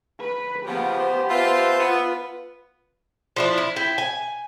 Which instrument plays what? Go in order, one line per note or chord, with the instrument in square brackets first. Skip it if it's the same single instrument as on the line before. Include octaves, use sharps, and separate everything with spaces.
[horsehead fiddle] B4
[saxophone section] C#3 F3 [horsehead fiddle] B3 G4
[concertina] C5
[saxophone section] F4 [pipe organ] B4 [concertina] C5 E5 A5
[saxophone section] B3 [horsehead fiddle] F4
[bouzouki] F3 D4 E4
E4
E4 G5
G#5